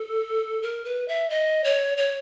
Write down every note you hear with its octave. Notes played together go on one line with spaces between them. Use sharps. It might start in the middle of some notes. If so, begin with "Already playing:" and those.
Already playing: A4
A#4
B4
E5
D#5
C#5
C#5